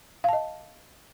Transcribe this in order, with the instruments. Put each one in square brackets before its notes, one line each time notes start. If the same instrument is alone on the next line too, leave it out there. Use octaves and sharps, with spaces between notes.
[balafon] F5
A5
D#5